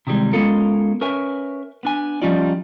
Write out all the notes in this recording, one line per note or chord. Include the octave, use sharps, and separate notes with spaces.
C3 D#3 E3 G3 G#3
G#3 B3 C#4 F4 A4 A#4
C#4 A#4 B4 C#5 E5 G#5
B3 D4 G#5
F3 G3 C#4 D#4 F4 D5